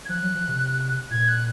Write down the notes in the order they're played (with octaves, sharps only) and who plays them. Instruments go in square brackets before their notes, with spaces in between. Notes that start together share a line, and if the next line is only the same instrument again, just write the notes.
[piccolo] G#6
[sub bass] F3 [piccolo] F#6
[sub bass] F#3
F3
C3
[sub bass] A#2 [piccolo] G#6
[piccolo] F#6